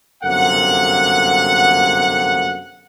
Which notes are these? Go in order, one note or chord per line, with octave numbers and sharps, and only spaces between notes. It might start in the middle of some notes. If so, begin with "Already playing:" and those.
G1 F#2 C3 A#3 A4 F#5